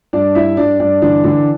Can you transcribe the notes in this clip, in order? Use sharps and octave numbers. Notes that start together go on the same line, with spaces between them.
G2 D4 D5
G2 E4 E5
G2 D4 D5
G2 D4 D5
D3 E3 D4
D3 E3 D4